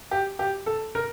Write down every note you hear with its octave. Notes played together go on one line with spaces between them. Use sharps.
G4
G4
A4
A#4